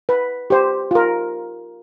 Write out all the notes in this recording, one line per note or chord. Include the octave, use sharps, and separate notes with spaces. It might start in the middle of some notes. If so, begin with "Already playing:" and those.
B4
G4 C5
F4 A#4